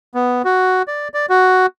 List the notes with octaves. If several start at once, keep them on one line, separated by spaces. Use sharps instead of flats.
B3
F#4
D5
D5
F#4